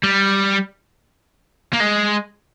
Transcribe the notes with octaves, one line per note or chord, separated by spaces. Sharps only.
G3
A#3
G#3